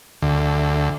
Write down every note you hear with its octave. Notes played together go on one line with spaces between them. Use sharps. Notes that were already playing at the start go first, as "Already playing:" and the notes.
D2